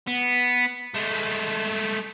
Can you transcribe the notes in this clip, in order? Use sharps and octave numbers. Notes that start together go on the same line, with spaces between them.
B3
G#3 A3